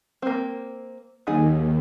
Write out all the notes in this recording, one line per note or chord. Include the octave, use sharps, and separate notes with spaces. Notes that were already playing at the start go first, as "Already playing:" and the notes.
A#3 C4
D#2 F#3 D#4 G#4